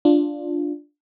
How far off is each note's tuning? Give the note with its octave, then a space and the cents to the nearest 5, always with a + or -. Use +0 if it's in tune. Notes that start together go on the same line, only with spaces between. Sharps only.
D4 +0 F4 +0